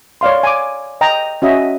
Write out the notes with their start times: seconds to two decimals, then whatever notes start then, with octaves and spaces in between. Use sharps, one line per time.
0.21 C#5 D5 F5 C6
0.43 G#5 D6
1.01 D#5 G5 A#5
1.42 C#4 F#4 D#5 E5